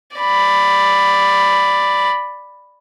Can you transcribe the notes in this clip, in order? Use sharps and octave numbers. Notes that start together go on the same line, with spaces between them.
D5 B5